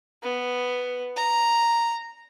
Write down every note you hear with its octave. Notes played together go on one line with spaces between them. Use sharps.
B3
A#5